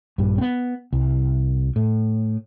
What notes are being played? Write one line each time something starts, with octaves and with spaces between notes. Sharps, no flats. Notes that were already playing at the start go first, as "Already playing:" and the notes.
A#1 G2
B3 C4
C2
A2